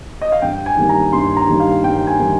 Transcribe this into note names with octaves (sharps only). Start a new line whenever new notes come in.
D#5
F5
G2 G5
G#5
D#3 G3 A#3
A#5
G2 C6
A#5
D#3 G3 A#3
F5
G2 G5
G#5
D#3 G3 A#3